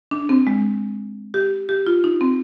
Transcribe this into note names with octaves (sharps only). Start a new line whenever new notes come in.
D4
C4
G#3
G4
G4
F4
D#4
C4